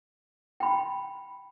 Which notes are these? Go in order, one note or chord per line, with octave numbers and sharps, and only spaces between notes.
G5 B5